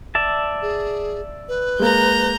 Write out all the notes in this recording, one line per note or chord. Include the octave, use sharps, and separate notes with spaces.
D5 E5 A5
G#4
B4
G#3 A#3 A#5 G6